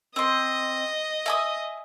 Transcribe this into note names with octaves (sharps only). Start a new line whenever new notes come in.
C4 D#5 C6
E5 G#5 D#6